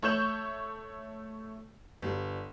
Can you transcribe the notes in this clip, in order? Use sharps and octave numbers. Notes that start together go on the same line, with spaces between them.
A3 C#5 C#6 G6 E7 F#7
G1 G3